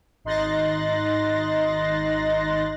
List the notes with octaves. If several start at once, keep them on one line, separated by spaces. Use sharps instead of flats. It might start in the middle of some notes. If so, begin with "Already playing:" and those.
G#1 D#4 C6 F#6 A6 A#6